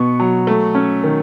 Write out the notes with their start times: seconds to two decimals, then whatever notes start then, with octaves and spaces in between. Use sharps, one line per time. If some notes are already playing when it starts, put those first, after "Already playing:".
Already playing: B2 B3 C#6
0.20 F#3
0.47 A3
0.75 C#4
1.03 D#3